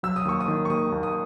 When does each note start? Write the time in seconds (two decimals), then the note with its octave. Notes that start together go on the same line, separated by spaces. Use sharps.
0.03 F#3 E6
0.16 D#6
0.25 D#2 C#6
0.41 D#6
0.48 D#3
0.65 C#6
0.70 D#2 D#6
0.92 D#2
1.03 D#6